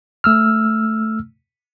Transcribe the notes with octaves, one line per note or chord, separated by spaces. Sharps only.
A3 E6 F6